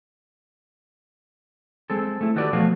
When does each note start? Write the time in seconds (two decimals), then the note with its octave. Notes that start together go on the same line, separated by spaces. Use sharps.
1.90 G#3 C4 A4
2.21 A3 E4
2.36 D#3 F#4 G4 A4 B4 D5
2.53 B2 F3 A3 F#4 F5